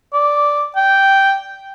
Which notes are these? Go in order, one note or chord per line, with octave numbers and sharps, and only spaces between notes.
D5
G5